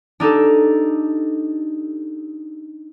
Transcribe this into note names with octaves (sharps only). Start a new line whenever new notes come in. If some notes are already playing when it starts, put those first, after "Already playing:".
D4 D#4 G4 A4